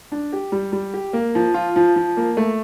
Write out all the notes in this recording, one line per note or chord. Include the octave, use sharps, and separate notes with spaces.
D4
G4
G3
G3
G4
A#3
F3
F4
F3
F3
A#3
A3